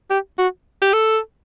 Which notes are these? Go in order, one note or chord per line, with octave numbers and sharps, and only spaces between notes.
G4
F#4
G4
A4